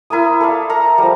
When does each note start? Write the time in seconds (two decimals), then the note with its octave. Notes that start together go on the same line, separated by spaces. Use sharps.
0.10 E4 A#4 G#5 D#6
0.40 A4 D5 F5
0.70 A4 A#4 E5 A#5
0.98 F3 G3